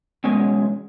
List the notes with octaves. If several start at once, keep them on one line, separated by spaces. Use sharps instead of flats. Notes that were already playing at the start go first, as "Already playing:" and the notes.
E2 B2 G#3 C#4